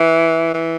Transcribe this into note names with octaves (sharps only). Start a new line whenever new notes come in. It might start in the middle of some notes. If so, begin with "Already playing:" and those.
Already playing: E3
E3